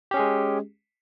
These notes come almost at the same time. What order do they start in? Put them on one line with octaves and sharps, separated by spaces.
G4 C#4 G#4 G#3